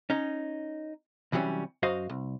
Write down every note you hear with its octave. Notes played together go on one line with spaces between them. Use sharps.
C#4 D#4
C2 E3 F#3 G3 C#4
F#2 F#4 C5 D#5 F5
C2